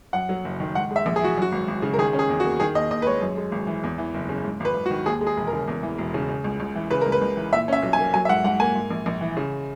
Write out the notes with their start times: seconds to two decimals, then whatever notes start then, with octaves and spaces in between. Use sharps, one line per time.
0.13 F#2 F#5
0.29 F#3
0.45 F#1
0.60 D#3
0.75 G#2 F#5
0.91 G#3
0.96 E5
1.06 A#1
1.16 G#4
1.22 E3 F#4
1.37 F#2 F#4
1.52 G#1
1.68 G#1
1.82 C#3
1.93 A#4
1.98 D#3 G#4
2.13 C#4
2.19 G#4
2.29 E2
2.40 F#4
2.44 A#3
2.60 D#3 G#4
2.75 D#2 D#5
2.90 D#2 D#5
3.02 B4
3.06 G#3 C#5
3.21 F#2
3.37 G#3
3.52 G#1
3.67 E3
3.84 E2
3.98 E3
4.14 F#1
4.29 C#3
4.44 G#2
4.60 G#1 B4
4.75 G#1
4.86 F#4
4.91 D#3
5.06 D#2 G#4
5.21 G#3
5.27 G#4
5.37 E1
5.47 A#4
5.52 C#3
5.68 E2
5.83 E3
5.98 E1
6.14 C#3
6.29 C#3
6.44 C#2
6.60 C#2
6.76 E3
6.90 C#3 B4
7.01 C#2 A#4
7.12 B4
7.21 C#2
7.37 E3
7.52 A#2 E5
7.68 C#4 E5
7.82 B1
7.93 G#5
7.98 A#3
8.14 F#3 G#5
8.25 E5
8.29 G#2 F#5
8.44 G#2 F#5
8.60 A#3 G#5
8.75 G#2
8.91 A#1
9.06 A#1
9.21 E3
9.37 C#3